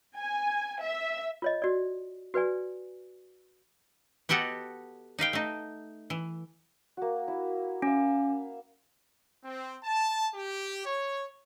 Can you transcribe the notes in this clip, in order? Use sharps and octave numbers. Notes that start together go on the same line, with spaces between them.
G#5
E5
F4 C#5 D#5
F#4 D5
F#4 B4 D5 G#5
B3 F#4 G4 A4 D#5 F#5
D#4 B4 F5 G5
A3 D#4
E3
A#3 F#4
E4
C#4 E5 F5
C4
A5
G4
C#5